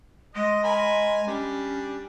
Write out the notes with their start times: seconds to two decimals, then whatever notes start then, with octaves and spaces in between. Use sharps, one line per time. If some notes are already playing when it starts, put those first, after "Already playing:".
0.35 G#3 D#5
0.64 A#4 G#5 B5
1.27 G3 C#4 D4